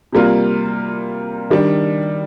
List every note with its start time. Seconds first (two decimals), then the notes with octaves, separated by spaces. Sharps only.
0.13 C3 G3 A#3 F4
1.50 D#3 G3 D4